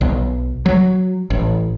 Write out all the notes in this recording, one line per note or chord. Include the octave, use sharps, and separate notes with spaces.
B1
F#3
A1